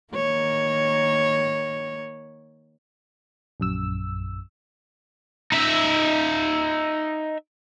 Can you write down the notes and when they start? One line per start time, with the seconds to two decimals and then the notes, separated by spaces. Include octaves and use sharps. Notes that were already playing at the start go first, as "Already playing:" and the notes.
0.14 D#3 A#3 C#5
3.60 A#1 F#2 E6
5.52 D#4 E5